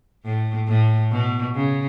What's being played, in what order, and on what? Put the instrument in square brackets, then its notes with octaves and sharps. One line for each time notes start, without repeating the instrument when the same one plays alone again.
[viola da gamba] A2
A2
B2
C#3